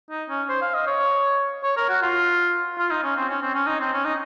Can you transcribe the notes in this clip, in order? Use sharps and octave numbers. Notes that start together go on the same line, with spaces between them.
D#4
C#4
C5
F5
D#5
C#5
C#5
A#4
F#4
F4
F4
D#4
C#4
C4
C#4
C4
C#4
D#4
C4
C#4
D#4